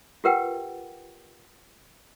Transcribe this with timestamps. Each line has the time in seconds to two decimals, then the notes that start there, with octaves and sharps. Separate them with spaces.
0.24 F4 G4 A#4 B4 F#5 G5